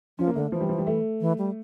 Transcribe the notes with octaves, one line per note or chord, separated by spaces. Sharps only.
F3 C#4
A#3
D3 A3
E3 F3
G3
F3
G3
A3
E3
G3